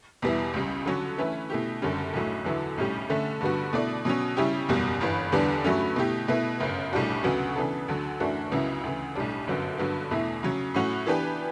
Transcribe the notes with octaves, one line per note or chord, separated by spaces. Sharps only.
E2 B2 G3 B3 E4
C#2 C#3 G3
D3 F#3 C#4
E3 A3 C#4 E4 B4
B2 A3 E4 G4
F#1 F#2 D3 G3 C#4
B1 A2 F#3 A3
E2 D3 F#3 B3 E4
B1 A2 G3 C#4 G4
D3 A3 C#4
G2 D3 G3 B3 F#4
B2 A3 E4 A4 D5
B2 F#3 C#4
C#3 G3 C#4 E4 G4
F#1 E2 B2 G3
G1 G2 E3
E2 D3 G3 B3 D4
G2 F#3 A3 C#4
B2 A3 E4 G4
B2 A3 E4 B4
G1 F#2 C#3
B1 A2 G3 D4 F#4
D2 C#3 F#3 B3 F#4
C#3 E3 B3 D4 A4
D2 D3 F#3
F#2 E3 A3 D4 F#4
C#2 C#3 F#3 B3 E4
D2 C#3 E3
B1 A2 G3 D4
G1 F#2 D3 F#3 B3
G2 D3 F#3 B3
E2 B2 A3 E4
C#3 F#3 C#4
A2 F#3 C#4 F#4
E3 B3 D4 G4 B4